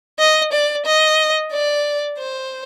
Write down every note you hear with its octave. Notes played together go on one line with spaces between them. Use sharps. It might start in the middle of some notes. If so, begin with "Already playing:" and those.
D#5
D5
D#5
D5
C5